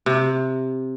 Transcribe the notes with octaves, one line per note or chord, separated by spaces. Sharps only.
C3